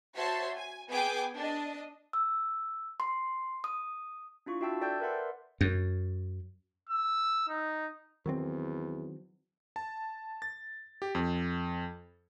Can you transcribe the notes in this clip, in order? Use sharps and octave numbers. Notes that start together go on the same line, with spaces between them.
F#4 C5 C#5 E5 A5 C6
G#5
B3 G#4 G5 G#5 D6 G6
D4 D#5
E6
C6
D#6
D4 E4 F4 C#6
D4 F#4 E5 G5 A5 E6
A4 D5 G5 A5 G6
A#4 B4 D5 E5 F#5 C6
F#2
E6
D#4
E2 D#3 F#3 C4
A5
A6
G4
F2